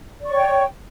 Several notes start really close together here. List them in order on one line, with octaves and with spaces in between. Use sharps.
D5 C#6 C#5 G5